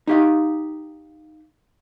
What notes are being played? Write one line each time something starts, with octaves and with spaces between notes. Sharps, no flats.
D#4 G4 F5